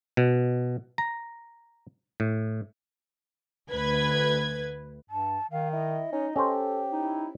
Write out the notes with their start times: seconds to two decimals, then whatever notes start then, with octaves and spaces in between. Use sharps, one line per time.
0.17 B2
0.98 A#5
2.20 A2
3.70 D2 B4 G#6
5.10 G2 A5
5.51 D#3 F5
5.73 E4 D#5
6.13 C#4 D#4
6.36 C#4 G4 A4 C5
6.92 D#4 E4